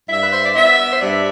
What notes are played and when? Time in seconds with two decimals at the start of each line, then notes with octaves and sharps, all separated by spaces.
0.09 G2 E5
0.22 B4
0.33 C5
0.44 D5
0.55 B3 E5
0.93 C5
0.99 G2 D5